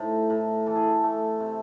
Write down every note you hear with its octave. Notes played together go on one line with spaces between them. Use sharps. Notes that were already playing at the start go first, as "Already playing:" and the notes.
Already playing: A2 D#4 C5
A2
E3 A4
G#4
A4
A3
C3